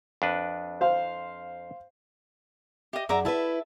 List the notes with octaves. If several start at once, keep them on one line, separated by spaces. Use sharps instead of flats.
F2 D4 B4
C5 F5
G4 D#5 E5
F#2 G#4 D5 E5 F#5 A#5 D6
E4 A#4 B4 E5 A5